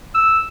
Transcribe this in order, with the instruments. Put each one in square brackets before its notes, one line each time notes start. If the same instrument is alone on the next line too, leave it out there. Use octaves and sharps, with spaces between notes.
[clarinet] E6